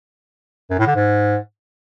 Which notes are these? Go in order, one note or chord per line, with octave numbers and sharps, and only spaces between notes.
F#2
A2
D3
G#2